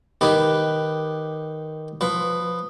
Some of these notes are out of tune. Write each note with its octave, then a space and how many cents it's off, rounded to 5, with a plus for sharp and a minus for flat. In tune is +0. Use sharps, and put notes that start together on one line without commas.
D#3 +0 G4 +0 B4 +0
F3 +20 B4 +10